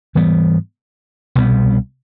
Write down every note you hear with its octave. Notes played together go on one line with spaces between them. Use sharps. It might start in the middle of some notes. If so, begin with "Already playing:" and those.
G#2 E3 G3 B3
C2 B2 G3 B3